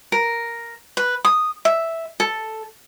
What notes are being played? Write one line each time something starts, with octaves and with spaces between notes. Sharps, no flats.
A#4
B4
D#6
E5
A4